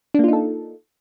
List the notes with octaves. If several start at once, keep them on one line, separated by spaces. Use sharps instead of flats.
A#3 D4 D#4 F4 A4